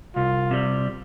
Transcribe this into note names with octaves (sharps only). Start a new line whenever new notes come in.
C2 F4
C3 G3